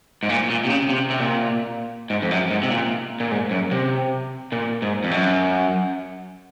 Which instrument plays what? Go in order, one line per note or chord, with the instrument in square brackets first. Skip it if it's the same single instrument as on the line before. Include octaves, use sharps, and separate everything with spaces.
[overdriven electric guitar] G#2
A#2
A#2
C3
C#3
C3
C3
A#2
G#2
F2
F#2
G#2
C3
A#2
A#2
G#2
F#2
C3
A#2
G#2
F2
F#2